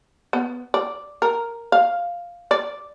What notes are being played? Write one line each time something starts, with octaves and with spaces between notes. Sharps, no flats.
B3
D5
A#4
F5
D5